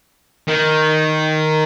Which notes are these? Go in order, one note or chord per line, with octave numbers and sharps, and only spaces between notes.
D#3